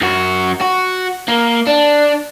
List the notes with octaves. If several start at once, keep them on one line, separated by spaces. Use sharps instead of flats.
F#2 F#4
F#4
A#3
D4